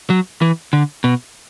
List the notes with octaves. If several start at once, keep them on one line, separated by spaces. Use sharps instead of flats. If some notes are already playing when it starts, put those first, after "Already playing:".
F#3
E3
D3
B2